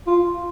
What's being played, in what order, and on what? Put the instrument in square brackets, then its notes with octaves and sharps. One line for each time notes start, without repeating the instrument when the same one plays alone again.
[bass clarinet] F4